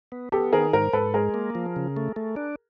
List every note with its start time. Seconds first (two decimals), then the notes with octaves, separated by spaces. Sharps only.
0.12 B3
0.32 B3 G4 A4
0.53 D#3 G#4 A#4
0.73 G#2 A#4 C5
0.93 G#2 A4 B4
1.14 G#3 G#4 A#4
1.34 A#3
1.55 F3
1.76 C#3
1.97 A3
2.16 A3
2.36 D4